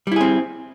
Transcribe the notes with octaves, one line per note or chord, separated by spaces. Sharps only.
G3 C4 E4 G#4